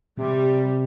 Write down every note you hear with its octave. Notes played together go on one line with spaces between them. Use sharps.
C3 G3